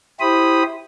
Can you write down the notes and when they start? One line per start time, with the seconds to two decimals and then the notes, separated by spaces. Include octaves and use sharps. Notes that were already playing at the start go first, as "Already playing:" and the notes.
0.20 E4 G4 C5 B5 D#6